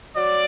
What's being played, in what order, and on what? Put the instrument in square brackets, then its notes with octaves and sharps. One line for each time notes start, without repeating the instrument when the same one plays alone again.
[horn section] F#3 D5